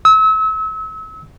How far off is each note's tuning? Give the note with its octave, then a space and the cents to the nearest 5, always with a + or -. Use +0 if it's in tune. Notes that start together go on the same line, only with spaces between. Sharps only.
E6 -35